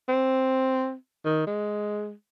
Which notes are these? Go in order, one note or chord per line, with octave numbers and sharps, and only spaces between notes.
C4
D#3
G#3